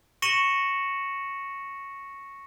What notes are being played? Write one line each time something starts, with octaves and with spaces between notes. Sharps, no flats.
C#6 A#6 C#7 D#7 E7 F#7